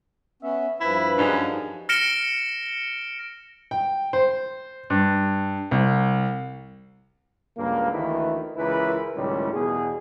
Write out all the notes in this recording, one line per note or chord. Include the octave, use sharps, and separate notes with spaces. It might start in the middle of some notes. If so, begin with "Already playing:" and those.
B3 C#4 E5
G2 F3 E4 B4
F#2 D4 D#4 G#4
F6 A#6 C#7 D7 E7 G7
G5
C5
G2
C2
C#2 G2 A#3
D2 D#3 E3 A3 B4
C#2 E3 E4 A#4 B4
C#2 A2 D#3 G3 C#4
E2 B2 G#4